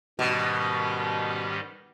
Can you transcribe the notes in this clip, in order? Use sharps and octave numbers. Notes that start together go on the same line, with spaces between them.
G#2 B2 D#3 G3 C#4 G4